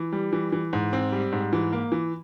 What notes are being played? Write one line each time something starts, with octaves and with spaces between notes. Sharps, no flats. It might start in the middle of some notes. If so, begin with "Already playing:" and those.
Already playing: E3
G3
E3
E3
G#2
C4
G3
G#2
E3
A#3
E3